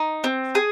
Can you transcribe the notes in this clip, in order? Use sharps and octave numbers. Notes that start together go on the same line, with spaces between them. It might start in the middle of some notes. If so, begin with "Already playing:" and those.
Already playing: D#4
C4
G#4